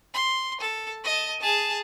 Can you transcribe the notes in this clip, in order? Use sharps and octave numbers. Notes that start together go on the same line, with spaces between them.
C6
A4
D#5 A5
G#4 A5